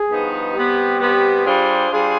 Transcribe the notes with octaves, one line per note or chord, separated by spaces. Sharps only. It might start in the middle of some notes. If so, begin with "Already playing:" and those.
Already playing: G#4
G2 F3 B3 D#4
C3 G3 B3 G4
C3 G3 B3
G3 D4 F4 G#4 C5
G3 D4 F4 G#4 C5